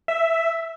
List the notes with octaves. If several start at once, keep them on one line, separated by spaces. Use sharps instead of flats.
E5